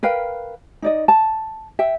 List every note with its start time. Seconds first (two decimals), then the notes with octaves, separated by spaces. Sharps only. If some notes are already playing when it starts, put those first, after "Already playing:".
0.03 A#4 B4 F5 G5
0.82 D#4 D5 D#5
1.08 A5
1.79 E5 G5